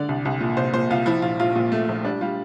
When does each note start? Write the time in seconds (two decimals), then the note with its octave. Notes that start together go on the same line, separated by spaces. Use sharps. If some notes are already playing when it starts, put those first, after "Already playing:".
Already playing: D3 D5
0.09 C2
0.25 C2
0.40 A#2
0.57 C2 C5
0.74 A#2 C5
0.90 C2 F4
1.06 F3 E4
1.22 A#1 F4
1.40 A#1 F4
1.55 A#2
1.72 A3
1.89 A#1
2.04 G3 D4
2.21 G3 F4